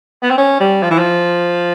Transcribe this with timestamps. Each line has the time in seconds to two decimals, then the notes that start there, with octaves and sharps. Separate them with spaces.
0.22 B3
0.30 C4
0.38 C#4
0.60 G3
0.83 F3
0.90 E3
0.98 F3